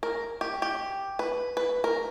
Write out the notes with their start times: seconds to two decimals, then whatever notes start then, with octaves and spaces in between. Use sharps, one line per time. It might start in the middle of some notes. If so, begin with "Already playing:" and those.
0.03 A#4
0.41 G4
0.62 G4
1.19 B4
1.57 B4
1.84 A#4